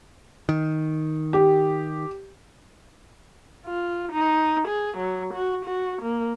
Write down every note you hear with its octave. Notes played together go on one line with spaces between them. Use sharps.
D#3
G4
F4
D#4
G#4
F#3
F#4
F#4
A#3